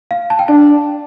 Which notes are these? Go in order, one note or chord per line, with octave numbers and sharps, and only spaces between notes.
F5
A5
G5
D4 A5